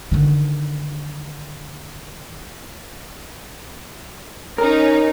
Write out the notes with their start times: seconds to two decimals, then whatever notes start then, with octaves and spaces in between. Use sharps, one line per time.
0.11 D3 D#3
4.58 C#4 D#4 A#4